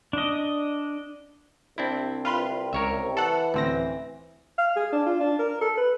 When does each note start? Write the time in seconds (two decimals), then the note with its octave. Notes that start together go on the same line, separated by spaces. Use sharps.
0.13 D4 D#5
1.78 C2 C3 C4 D4 E4
2.25 F4 B4 C6
2.73 C#2 A#4 C#5 E5
3.17 E3 A4 F#5
3.54 A1 D2 C4 A#6
4.58 F5
4.76 G#4
4.92 D4
5.06 F4
5.20 D4
5.39 A#4
5.61 A4
5.77 B4